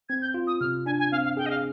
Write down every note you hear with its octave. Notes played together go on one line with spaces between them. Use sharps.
C4 G#6
G6
F4
D#6
C3 F6
D4 G#5
G#5
C4 F5
F5
G#4 G5
D#5
F5